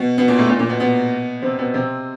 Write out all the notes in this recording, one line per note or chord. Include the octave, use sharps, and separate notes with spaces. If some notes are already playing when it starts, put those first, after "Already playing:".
Already playing: B2 B3
B2 B3
A#2 A#3
A2 A3
A#2 A#3
A#2 A#3
B2 B3
B2 B3
C3 C4
B2 B3
C3 C4